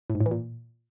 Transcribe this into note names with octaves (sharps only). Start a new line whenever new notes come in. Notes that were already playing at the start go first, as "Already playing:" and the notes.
A2
G#2
A2
E3
A#2